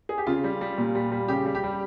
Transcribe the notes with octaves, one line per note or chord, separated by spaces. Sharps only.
G#4
G4
C#3 F4
G3
G3
A#2
G3
G3
C#3 G4
G3
G4
G3